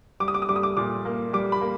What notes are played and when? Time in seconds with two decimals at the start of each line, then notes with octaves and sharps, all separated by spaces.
0.20 G3 D6
0.28 D#6
0.34 D6
0.42 D#6
0.49 G3 D6
0.56 D#6
0.63 D6
0.77 A#2 D6
1.05 A#3
1.33 G3 D6
1.52 B5
1.61 A#3